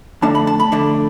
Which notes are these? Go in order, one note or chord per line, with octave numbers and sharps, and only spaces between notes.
F2 D3 A3 D4 A5
B5
A5
B5
F2 D3 A3 D4